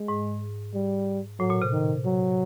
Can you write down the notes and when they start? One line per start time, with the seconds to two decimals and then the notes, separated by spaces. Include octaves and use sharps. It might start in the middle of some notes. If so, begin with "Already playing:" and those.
Already playing: G#3
0.08 G#2
0.74 G3
1.40 A2 F#3
1.50 A#2
1.62 C3
1.72 D#3
2.05 F#3